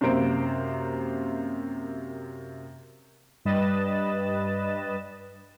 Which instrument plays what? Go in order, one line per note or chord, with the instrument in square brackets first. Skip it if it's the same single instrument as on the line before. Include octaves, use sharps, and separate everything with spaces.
[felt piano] F#2 C3 A#3 C5 D7
[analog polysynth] G2 G3 B4 D#5 A6 E7